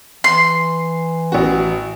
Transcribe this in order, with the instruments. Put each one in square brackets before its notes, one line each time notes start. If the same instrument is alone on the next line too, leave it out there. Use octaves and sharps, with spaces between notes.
[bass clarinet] E3 [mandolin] C6
[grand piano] A1 F#4